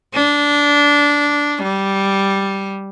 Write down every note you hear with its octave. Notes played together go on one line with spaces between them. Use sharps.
D4
G3